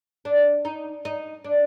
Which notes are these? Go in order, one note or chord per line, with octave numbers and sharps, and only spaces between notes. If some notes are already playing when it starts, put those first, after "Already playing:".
D4
D#4
D#4
D4